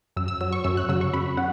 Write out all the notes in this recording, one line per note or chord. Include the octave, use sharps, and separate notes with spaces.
F#2 E6
E6
F#3 E6
C#6
F#2 E6
F#6
C#3 F#3 E6
C#6
F#2 B5
C#3 F#5